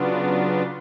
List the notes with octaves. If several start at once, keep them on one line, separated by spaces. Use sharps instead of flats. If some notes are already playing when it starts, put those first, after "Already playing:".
Already playing: C#3 F#3 B3 D4 F4